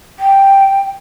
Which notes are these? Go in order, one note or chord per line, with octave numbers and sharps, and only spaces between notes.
G5